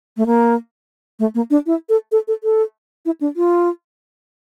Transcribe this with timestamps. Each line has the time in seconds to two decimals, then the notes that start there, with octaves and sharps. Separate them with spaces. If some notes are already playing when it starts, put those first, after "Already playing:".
0.17 A3
0.26 A#3
1.19 A3
1.35 A#3
1.50 D4
1.66 E4
1.89 A4
2.12 A4
2.28 A4
2.44 A4
3.05 E4
3.21 D4
3.36 F4